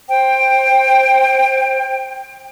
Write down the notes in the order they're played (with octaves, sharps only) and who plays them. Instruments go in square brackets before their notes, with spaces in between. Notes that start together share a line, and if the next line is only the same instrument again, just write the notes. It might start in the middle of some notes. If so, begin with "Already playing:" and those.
[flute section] C5 G5